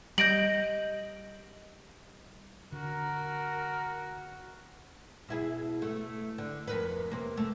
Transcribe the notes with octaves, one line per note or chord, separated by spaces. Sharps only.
G3 D#5 G6 A#6 D7 F#7
D3 F#4 A#4
B2 E4 G#4
A3
D3
F2 A#4 B4
C3 A#3
A3